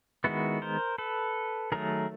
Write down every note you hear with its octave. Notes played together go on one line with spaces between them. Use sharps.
D#3 G#3 B3 E4 F#4
A#4 C5
A4 B4
D#3 F#3 A3 G#4 A#4